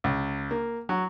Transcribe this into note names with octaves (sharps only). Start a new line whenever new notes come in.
C#2
A#3
F#3